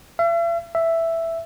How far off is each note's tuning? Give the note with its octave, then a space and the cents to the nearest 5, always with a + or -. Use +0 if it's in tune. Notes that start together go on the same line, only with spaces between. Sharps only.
E5 +45
E5 +5